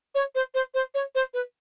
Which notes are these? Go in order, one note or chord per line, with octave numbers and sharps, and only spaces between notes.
C#5
C5
C5
C5
C#5
C5
B4